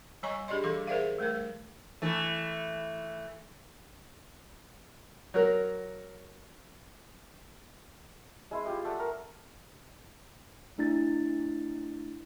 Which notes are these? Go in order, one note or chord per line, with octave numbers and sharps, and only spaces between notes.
G3 C#5 D#5 G#5 A#5 C#6
D4 G4 G#4 D5 D#5 C6
E3 G3 A4 D6
G#4 A#4 C5 D5 E5 F5
G3 A3 A#4 B4
E3 A3
F#3 A#4
G#3 E4 C6
F4 G4 D#5
A3 D5 E5 F#5
A#4
A3 D4 E4 A6